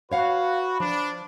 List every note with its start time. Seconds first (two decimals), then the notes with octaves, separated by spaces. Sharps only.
0.12 F#4 B4 C#5 F5 F#5
0.80 F3 D4